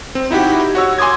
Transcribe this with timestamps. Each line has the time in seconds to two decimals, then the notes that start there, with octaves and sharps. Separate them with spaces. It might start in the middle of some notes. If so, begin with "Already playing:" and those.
0.15 C4
0.31 D#4 E4 F#4 G4
0.75 F#4 C#5 E6
0.98 G#5 C6 D6 D#6 G#6